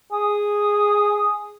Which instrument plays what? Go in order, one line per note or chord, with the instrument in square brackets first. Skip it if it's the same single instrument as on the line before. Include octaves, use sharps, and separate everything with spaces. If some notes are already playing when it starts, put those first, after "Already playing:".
[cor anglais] G#4